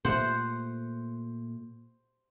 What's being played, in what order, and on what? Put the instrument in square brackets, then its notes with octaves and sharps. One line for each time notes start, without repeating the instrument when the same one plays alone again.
[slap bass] A#2 A3 [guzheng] C5 F#5